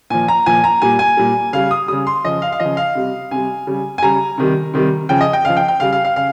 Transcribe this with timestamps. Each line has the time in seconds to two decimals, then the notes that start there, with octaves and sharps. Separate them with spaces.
0.10 A#2 F3 G#5
0.28 A#5
0.46 A#2 F3 G#5
0.64 A#5
0.82 A#2 G3 G#5
0.99 G#5
1.17 A#2 G3
1.53 C#3 G3 F5
1.71 D#6
1.88 C#3 G3 D#6
2.07 C6
2.24 C#3 F3 D#5
2.42 F5
2.52 F5
2.60 C#3 F3 D#5
2.77 F5
2.95 C3 G3
3.31 C3 G3 G#5
3.67 C#3 G3
3.98 G#5
4.02 C#3 G3 A#5
4.38 C3 D#3 G3
4.74 C3 D#3 G3
5.09 C#3 F3 G5
5.21 D#5
5.33 G5
5.44 C#3 F3 F5
5.57 G5
5.68 G5
5.80 C#3 G3 F5
5.93 F5
6.05 F5
6.16 C#3 F5